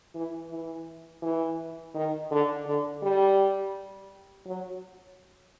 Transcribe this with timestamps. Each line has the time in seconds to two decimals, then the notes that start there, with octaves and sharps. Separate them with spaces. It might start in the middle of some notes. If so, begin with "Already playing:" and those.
0.15 E3
0.50 E3
1.22 E3
1.95 D#3
2.31 D3
2.66 D3
3.03 G3
4.47 F#3